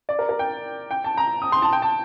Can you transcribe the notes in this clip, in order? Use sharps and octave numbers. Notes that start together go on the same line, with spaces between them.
D5
A#4
A#4
G5
G5
A5
A#5
D#6
C6
A5
G5
A5